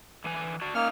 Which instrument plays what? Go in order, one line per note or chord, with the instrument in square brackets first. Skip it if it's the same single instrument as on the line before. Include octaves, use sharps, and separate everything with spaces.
[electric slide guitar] D3 E3 G#5
F#4 D5 A5
[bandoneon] A#3 F6 [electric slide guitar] C#4 D#4